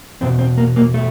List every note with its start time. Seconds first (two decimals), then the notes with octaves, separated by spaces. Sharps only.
0.21 E2 B2 C4
0.39 C4
0.57 A#3
0.76 A#3
0.94 A3